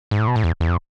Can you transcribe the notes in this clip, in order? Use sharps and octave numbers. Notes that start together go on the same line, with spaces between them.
G#2
A2
B2
A2
E2
E2
F2